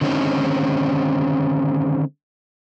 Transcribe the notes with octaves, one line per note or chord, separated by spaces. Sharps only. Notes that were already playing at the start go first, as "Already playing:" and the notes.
D3 D#3 G#3 C4 C#4 D#4